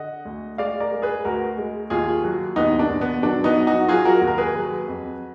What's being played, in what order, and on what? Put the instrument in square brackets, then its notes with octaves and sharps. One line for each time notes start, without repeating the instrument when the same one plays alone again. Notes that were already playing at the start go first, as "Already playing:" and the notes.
Already playing: [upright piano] D3 D#5 F#5
D2
G#3 D5 F5
A#4 D5
G#3
G#4 B4
D2 F#4 A#4
G#3
D#2 F4 G#4
F#3
D#2 B3 D#4
D4
D#2
B3
F#3 D4
B3 D#4
F#3
D#4 F#4
F#3 F4 G#4
F#4 A#4
D#2
A#4
G#4 B4
F#3
F2